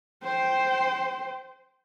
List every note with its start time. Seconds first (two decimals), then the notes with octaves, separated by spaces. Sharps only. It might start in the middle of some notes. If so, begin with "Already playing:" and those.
0.23 C5 G5